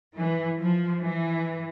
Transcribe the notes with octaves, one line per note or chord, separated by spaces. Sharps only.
E3
F3
E3